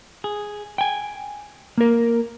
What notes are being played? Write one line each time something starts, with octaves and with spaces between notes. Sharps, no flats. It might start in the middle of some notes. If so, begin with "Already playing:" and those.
G#4
G5 G#5
A#3 A#4